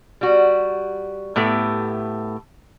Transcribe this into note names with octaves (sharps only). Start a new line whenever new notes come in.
G3 F#4
A2 A3 B3 G4 A4